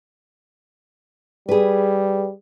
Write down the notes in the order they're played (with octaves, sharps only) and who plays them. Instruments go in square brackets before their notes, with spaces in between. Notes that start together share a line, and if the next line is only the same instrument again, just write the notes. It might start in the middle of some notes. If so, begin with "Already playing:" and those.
[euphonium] G3 [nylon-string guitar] G#4 B4